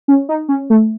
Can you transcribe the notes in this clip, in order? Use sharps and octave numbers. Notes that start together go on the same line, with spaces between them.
C#4
D#4
C#4
A3